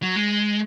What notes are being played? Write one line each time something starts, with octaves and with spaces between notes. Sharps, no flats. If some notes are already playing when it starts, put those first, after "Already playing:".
F#3
G#3